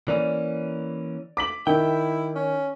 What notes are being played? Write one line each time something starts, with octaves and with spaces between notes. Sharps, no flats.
E3 A#3 C#4 D5
D6 B6 F#7
D#3 E4 G5
C#4